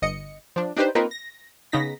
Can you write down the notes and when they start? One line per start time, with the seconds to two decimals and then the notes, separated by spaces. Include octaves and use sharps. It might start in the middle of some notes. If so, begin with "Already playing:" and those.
0.02 G1 D#5 C#7
0.56 F3 D4
0.77 D4 D#4 G4 B4 C5
0.95 A#3 C4 D#4 F4 A#4 B4
1.11 A#6
1.72 C#3 B3 D#4 A#6 B6